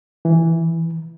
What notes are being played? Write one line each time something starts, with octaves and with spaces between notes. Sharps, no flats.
E3